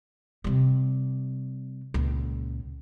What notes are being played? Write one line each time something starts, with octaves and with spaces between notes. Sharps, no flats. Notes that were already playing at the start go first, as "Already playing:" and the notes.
C3 G3
C#2 A#2